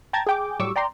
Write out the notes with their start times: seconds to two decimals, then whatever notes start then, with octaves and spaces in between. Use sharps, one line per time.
0.13 G5 A5 A#5 G#6 A6
0.27 G#4 G5 D6
0.59 A2 F#3 G3 C#6 D6 E6
0.76 D5 G5 A#5 C6